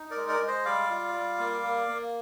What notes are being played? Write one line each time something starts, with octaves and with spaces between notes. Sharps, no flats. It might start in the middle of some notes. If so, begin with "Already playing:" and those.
Already playing: D#4
A#4 D5
G#3
A#4 D5
G#3
C5 D#5
G3 D5 F5
F4
G3
A#3
A#3
A#3